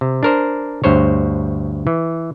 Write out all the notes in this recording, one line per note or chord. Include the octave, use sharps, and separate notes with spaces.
C3
D4 A#4 C5
D2 G2 C5 C#5
E3